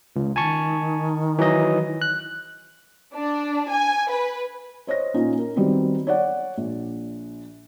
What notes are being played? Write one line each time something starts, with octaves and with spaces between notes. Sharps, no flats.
C#2
D#3 G#5 A5 C#6
E3 F#3 D#5
F#6
D4
G#5
B4
C5 C#5 D#5 A#6
A#2 C#4 D#4 F4
A#4
D#3 F#3 G3 B3 C4 D#4
C#5 D5 F#5
A#1